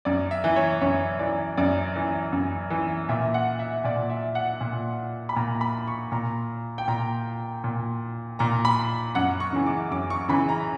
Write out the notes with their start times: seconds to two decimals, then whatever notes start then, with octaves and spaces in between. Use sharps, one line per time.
0.05 F#2 D5
0.31 E5
0.44 E3
0.56 C#5
0.81 F#2 C#5
1.19 E3 D5
1.57 F#2 D5
1.96 E3
2.33 F#2
2.70 E3
3.09 A#2 E5
3.34 F#5
3.59 E5
3.84 A#2 D5
4.10 E5
4.35 F#5
4.61 A#2
5.29 B5
5.36 A#2 A#5
5.61 B5
5.87 C#6
6.12 A#2 A#5
6.78 G5
6.88 A#2 A#5
7.64 A#2
8.39 A#2 A#5
8.65 B5
9.15 F#2 F#5
9.40 C#6
9.53 C#3 E3
9.66 D6
9.91 F#2 D6
10.10 C#6
10.28 C#3 E3 B5
10.49 A#5